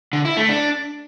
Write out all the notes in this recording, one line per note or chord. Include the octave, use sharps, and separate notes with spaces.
D3
E4
A3
D4